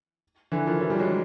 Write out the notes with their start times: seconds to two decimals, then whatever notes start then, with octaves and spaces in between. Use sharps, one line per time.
0.52 D3 E3
0.66 D#3 F3
0.81 E3 F#3
0.90 F3 G3
0.99 F#3 G#3